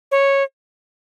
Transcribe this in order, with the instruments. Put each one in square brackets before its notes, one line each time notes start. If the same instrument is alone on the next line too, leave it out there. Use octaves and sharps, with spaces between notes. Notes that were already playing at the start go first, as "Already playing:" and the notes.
[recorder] C#5